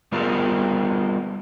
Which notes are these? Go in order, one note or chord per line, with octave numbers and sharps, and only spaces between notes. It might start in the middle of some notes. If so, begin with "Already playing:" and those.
G3 B3 F4 A#4 C5